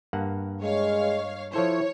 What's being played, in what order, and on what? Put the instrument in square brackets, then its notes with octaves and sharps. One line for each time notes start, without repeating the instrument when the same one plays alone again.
[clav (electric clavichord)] G2 A#3 F#5
[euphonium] G#3 [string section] C#5 F5
[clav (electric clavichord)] F3 A4 C5 [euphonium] E4 [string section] C#5